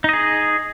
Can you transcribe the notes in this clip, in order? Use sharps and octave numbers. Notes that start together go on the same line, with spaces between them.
D#4 G#4 D#5